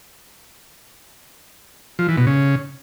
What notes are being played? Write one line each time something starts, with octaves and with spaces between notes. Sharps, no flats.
F3
E3
B2
C#3